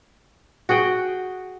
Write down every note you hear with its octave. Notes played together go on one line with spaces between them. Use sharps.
F#4 G#4 F#5 G5